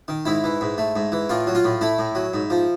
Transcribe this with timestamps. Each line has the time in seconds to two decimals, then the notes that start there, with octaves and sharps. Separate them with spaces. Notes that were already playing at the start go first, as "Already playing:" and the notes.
0.08 D#3
0.26 G#2 E4
0.44 E3
0.61 G#2
0.78 A3
0.96 G#2
1.12 E3
1.30 A2 F4
1.47 F#3
1.55 F4
1.65 A2
1.81 A3 E4
1.99 A2
2.15 F#3
2.34 G#2
2.50 F3